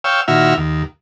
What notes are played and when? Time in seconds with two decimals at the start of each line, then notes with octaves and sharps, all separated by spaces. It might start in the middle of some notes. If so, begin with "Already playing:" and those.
0.04 C#5 F5 G5 E6
0.28 A#2 D#3 E4 F#4 E5 F6
0.57 D#2